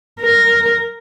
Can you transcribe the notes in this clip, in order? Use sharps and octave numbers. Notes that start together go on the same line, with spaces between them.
A#4